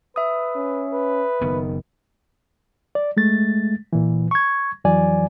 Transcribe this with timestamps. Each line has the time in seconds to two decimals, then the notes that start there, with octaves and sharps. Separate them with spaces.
0.16 B4 E5 D#6
0.56 C#4
0.92 B4
1.41 F#1 D#3 B3
2.95 D5
3.17 G#3 A3 A6
3.93 A#2 E3
4.31 C#6 G#6
4.84 F2 E3 F#3 D5 G#5